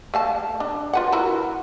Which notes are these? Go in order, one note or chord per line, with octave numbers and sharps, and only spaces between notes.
A3 F5 A5
D4
F4 B4 F#5
E4 F#4 A#4